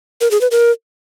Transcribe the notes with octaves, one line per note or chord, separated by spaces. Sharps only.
A#4
G#4
B4
A#4